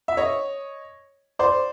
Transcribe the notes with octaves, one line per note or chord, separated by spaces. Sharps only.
E5
C#5 D#5
C5 D5